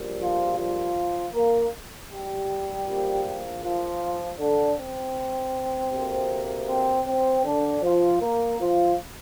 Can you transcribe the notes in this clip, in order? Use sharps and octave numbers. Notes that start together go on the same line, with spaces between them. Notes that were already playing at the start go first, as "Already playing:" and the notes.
Already playing: A#1 A#2 G3
F3 F4
F3 F4
A#3 A#4
G3 G4
A#1 A#2 F3 A#3
F3 F4
D3 D4
C4
D2 C3 A#3
C4
C4
D3 D4
F3 F4
A#3 A#4
F3 F4